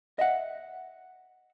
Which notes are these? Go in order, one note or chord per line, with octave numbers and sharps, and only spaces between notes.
D#5 E5 F#5